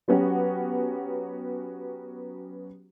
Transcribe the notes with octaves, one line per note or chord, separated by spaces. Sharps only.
F#3 B3 C#4 F#4 G4